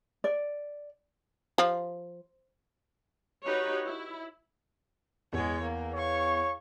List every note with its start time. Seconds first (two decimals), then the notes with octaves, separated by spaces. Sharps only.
0.24 D5
1.58 F3
3.45 D#4 F#4 G4 B4 C#5
3.85 E4
5.33 E2 G#3 C#5
5.62 A#3
5.94 C#5 F5 C#6